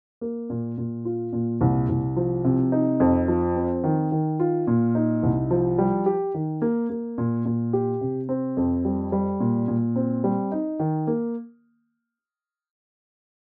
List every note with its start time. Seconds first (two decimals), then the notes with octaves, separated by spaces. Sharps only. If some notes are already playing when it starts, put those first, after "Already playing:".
0.21 A#3
0.50 A#2
0.78 A#2
1.05 F4
1.33 A#2
1.61 C2
1.89 C2
2.16 F3
2.44 C3
2.72 D#4
3.00 F2
3.28 F3
3.56 C4
3.84 D#3
4.12 D#3
4.39 F4
4.67 A#2
4.95 D#4
5.23 C2
5.51 F3
5.78 G3
6.06 G4
6.34 D#3
6.62 A#3
6.90 A#3
7.18 A#2
7.45 A#2
7.73 G4
8.01 C3
8.29 C4
8.57 F2
8.85 G3
9.12 G3
9.40 A#2
9.68 A#2
9.96 C4
10.24 G3
10.52 D#4
10.80 D#3
11.07 A#3